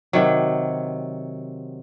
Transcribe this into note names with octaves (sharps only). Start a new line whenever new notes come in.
C3 D#3 F#3